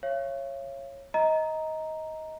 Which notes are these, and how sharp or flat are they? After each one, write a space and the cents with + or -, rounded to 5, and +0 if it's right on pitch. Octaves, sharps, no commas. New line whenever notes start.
C#5 -15 F5 -45
D#5 +20 A#5 +0